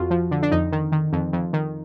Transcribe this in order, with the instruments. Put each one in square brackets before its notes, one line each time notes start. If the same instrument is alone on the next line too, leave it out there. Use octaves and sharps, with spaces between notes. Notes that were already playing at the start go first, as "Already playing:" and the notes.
Already playing: [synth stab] F2 F4 F#4
F3
D3
D4
F2 D#4
D#3
D#3
F2
F2
D#3